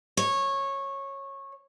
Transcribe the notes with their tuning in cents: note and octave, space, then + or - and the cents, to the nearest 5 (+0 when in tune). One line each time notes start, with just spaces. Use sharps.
C#5 -15